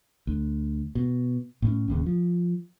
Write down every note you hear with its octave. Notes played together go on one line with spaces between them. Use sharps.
D2
B2
A2 C4 C#4
D1 D#2 C#3
F3